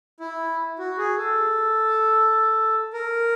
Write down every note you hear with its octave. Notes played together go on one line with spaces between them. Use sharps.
E4
F#4
G#4
A4
A#4